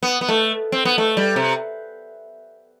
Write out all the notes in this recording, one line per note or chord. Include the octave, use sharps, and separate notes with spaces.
B3
B3
A3
C4
B3
A3
G3
C3